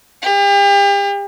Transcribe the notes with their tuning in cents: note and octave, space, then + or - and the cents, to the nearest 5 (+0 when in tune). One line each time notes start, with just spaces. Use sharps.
G4 +40